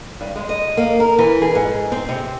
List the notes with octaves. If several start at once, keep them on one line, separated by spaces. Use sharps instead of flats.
G2
G#3
D#5
A#3
A#4
E3
G#4
G#2
C4
C3